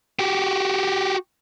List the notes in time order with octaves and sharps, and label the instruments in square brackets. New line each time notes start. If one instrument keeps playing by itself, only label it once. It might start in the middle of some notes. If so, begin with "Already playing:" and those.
[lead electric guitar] F#4 G4